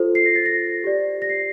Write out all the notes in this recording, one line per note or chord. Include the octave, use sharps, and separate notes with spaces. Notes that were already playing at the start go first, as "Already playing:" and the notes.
Already playing: F4 A4 C5
C7
A#6
A6
A#6
G4 D5
A#6
C7